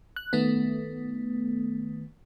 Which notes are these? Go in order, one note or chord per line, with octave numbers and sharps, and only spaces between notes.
F#6
D#3 A3 B3